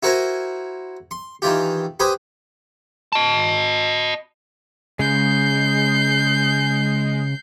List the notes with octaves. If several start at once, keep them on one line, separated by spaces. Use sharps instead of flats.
E4 F#4 A#4 C5 G#5 A#5
C6
D#3 E3 F4 G4
G4 B4 C5 G#5 D#6
D#5 A5
C#3 G#3 G6 C7